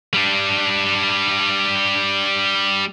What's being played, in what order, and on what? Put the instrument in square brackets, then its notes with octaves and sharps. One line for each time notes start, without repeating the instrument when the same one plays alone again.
[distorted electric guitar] G3 D4